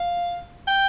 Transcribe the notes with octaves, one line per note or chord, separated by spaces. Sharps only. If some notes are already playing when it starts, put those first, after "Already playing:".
Already playing: F5
G5